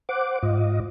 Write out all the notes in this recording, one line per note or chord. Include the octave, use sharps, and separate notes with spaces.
C5 F#5 D6
G#2 F4 D#5